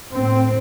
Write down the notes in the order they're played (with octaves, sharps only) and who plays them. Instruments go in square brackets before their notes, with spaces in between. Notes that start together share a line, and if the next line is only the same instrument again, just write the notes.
[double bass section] A2 C4